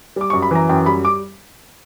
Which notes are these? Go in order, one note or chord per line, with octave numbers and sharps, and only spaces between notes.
G3 D6
C#6
F#2
B5
E3 A#5
F#2 G5
G3 B5
D6